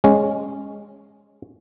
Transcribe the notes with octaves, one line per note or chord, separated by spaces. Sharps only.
G#3 C#4